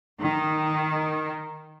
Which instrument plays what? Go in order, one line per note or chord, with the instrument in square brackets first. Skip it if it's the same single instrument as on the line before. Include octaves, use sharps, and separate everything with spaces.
[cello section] D#3